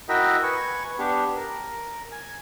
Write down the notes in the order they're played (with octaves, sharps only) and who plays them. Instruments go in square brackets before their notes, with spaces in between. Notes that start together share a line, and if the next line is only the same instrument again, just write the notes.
[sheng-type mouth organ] E4 F#4 A#4 D#5 E5 G5
B4 G#5 C#6
B3 D4 G4
A#4
G#5